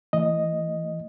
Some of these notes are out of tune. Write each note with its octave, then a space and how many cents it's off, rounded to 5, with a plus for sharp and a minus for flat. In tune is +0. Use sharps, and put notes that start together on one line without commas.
E3 +0 A3 +30 D#5 +0